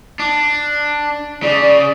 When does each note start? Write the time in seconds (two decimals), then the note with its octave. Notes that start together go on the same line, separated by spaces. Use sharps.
0.19 D4
1.43 C#3 D5